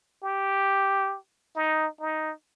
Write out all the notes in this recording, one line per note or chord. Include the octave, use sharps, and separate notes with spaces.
G4
D#4
D#4